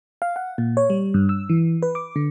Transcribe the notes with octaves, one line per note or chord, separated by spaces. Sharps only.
F5
F#5
A#2
C#5
G3
G2
E6
E3
B4
D6
D3